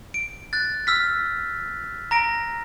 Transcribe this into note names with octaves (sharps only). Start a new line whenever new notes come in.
D7
F#6 A6
E6 F6 B6
A#5 A#6 D7